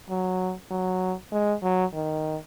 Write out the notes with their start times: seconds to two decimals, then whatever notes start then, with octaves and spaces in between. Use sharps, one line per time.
0.10 F#3
0.71 F#3
1.32 G#3
1.63 F#3
1.94 D#3